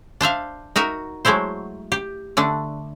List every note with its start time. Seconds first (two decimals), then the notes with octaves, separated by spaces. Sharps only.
0.21 D4 C5 E5 F5
0.76 D#4 F#4 A#4 E5
1.25 F#3 G#3 A3 E4 C5
1.92 G4
2.37 D3 A3 D4